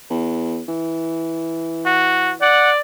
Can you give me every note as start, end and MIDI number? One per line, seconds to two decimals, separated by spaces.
0.10 0.61 40
0.68 2.51 52
1.86 2.33 66
2.42 2.81 74
2.42 2.71 78